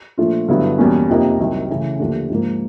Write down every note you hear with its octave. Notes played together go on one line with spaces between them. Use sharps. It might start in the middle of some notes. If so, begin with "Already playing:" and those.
A#2 F3 A3 D4 F4
G2 D3 F#3 B3 E4
E2 B2 G3 A#3 C#4
F2 C3 F3 A#3 D#4
C2 C3 D#3 F#3
C#3 E3 A3 C#4
D#2 D3 F3 A3 D4
G#2 F3 A#3